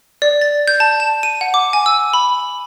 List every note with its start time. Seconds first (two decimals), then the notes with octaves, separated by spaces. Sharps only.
0.22 D5
0.41 A6
0.68 G6
0.80 A5
1.00 E7
1.23 D#7
1.41 F#5
1.54 D6
1.73 G#5
1.86 E6
2.13 B5